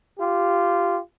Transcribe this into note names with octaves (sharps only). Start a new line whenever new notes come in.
F4 G4